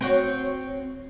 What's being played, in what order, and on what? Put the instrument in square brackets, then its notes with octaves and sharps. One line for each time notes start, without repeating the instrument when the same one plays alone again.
[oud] C4 F#4 C#5